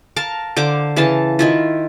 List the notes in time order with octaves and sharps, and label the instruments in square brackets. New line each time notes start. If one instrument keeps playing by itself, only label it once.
[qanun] A#4 F5 A5
D3 C5 F5 D6
C#3 E3 F5 A5
D#3 E4 F4